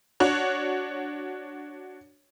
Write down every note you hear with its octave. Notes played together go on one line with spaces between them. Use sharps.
D4 F#4 C#5